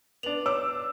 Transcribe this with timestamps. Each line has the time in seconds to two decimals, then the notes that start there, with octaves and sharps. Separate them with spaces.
0.23 B3 D4 F7 F#7
0.46 C#5 D6 E6